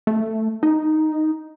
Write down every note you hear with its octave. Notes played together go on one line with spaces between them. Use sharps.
A3
D#4